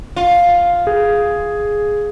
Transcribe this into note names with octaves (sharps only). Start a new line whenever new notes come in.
F4
G#4